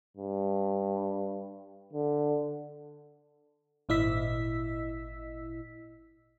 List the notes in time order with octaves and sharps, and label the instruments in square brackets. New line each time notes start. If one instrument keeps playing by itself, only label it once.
[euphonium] G2
D3
[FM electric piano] G#1 A#2 E4 D#5 E6 B6